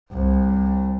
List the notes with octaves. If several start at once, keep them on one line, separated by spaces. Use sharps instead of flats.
C2